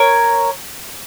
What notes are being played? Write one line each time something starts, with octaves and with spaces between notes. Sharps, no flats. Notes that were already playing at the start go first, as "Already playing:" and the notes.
Already playing: A#4 C#5